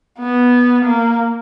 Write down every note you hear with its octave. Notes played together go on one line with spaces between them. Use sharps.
B3
A#3